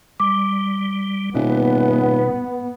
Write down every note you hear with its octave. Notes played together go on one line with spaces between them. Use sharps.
G3 D6
D#1 B2 B3